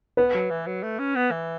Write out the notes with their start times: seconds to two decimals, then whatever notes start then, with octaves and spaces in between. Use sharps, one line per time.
0.17 B3 B4
0.34 F#3
0.50 E3
0.67 F#3
0.83 A3
0.99 C#4
1.15 B3
1.31 E3